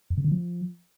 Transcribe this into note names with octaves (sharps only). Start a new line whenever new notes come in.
F2
C#3
D3
F3